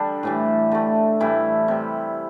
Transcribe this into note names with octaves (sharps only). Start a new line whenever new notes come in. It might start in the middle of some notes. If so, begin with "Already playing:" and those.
Already playing: D3 G3 D4
A2 E3 G3
D3 A3
A2 E3 G3 E4
C3 G3